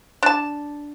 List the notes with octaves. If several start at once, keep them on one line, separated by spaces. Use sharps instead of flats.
D4 A5